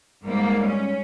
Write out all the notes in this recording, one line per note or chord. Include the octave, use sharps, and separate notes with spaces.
G#2 G3 G#3 A#3
C#4